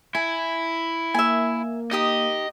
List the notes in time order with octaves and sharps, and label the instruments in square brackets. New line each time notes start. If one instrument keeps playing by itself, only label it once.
[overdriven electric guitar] E4 [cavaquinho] G#5
[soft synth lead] A#3 [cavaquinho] E5 G#5
[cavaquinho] D#4 G4 D#6 [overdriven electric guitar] D#5